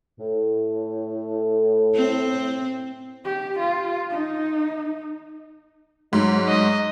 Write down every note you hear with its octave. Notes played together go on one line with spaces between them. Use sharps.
A2
C4
G4
F4
D#4
G#2 F#3
D#5